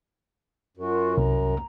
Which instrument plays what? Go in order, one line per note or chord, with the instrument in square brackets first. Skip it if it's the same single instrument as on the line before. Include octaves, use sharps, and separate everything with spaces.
[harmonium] F#2 [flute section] F4 F#4 A#4
[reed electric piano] C2 [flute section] A#5